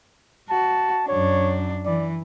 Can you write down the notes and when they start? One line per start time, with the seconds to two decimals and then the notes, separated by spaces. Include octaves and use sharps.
0.50 F#4 A5
1.08 F#2 D4 C#5
1.85 E3 D5